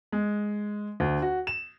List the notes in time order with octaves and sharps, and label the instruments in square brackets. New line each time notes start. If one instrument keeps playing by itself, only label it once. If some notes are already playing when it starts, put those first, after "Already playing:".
[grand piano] G#3
D2
F#4
E7